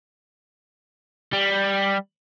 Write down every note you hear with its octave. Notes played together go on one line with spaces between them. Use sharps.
G3